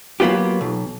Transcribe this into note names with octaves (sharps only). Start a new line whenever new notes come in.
F#3 A#3 B3 F4 G4
B1